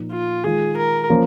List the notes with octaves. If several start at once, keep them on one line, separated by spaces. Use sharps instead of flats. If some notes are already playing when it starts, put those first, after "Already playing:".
Already playing: A#2 F3 A#3 D#4
F4
D#3 G#3 F4 G#4
A#4
F3 A#3 C#4 F4